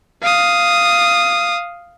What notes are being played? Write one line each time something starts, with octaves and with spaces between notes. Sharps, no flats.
F5 D#6